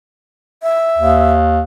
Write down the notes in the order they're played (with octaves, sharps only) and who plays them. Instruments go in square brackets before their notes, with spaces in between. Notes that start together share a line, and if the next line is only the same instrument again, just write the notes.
[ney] E5
[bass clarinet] D#2